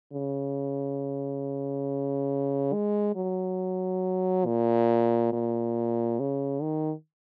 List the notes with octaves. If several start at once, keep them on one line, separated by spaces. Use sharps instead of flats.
C#3
G#3
F#3
A#2
A#2
C#3
D#3